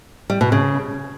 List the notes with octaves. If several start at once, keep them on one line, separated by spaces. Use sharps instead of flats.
G3
B2
C#3